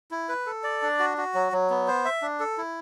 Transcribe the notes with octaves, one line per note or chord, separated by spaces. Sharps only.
E4
B4
A4
D5
D4
F#4
F#4
F#3
F#3
B3
C5
E5
D4
A4
E4